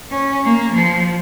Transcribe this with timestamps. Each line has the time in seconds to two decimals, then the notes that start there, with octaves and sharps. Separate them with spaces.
0.11 C#4
0.44 A#3
0.73 F3